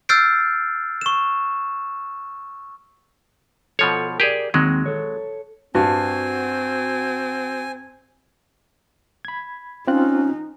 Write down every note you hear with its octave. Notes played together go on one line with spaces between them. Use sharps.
E6 F6 G6 A6 C7 D7
C#6 E7
B2 F3 A4 C#5
G4 G#4 A#4 D5
D#2 D#3 F#3 G#3 C4
A4 C#5
G2 C4 F#4 G#5
B5 G#6
C4 C#4 D#4 F4 F#6